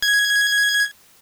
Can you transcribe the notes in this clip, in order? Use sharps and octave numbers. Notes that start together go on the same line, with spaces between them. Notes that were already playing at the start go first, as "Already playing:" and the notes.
G#6